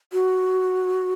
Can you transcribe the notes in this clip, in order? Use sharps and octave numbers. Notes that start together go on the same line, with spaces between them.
F#4